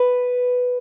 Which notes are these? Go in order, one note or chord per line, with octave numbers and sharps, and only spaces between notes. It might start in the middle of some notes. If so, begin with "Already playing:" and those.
Already playing: B4